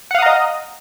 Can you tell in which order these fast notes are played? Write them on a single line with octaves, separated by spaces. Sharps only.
F#5 F5 D#6 A#5 D#5